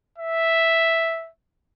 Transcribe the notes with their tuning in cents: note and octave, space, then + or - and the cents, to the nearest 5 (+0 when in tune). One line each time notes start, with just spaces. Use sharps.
E5 +0